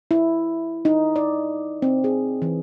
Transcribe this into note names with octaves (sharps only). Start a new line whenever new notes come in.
E4
D#4
D5
C4
G#4
E3